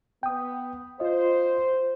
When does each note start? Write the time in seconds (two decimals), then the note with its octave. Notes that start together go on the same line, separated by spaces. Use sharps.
0.23 B3 G5 D#6
1.00 F4 C5 D#5